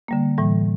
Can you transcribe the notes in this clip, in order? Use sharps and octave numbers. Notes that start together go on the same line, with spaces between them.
D3 G3 A#3
A2 E3 G3